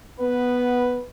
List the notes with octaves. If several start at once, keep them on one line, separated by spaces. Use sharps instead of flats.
B3 B4